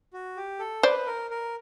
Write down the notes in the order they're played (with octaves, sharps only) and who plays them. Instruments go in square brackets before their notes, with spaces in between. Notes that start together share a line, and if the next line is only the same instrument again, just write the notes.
[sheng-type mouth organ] F#4
G4
A4
[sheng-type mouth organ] B4 [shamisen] C5 D5
[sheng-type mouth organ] A#4
A#4